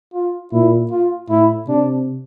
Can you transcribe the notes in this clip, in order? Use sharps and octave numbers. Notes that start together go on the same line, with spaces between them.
F4
A#2 E4
F4
A2 E4
C3 D4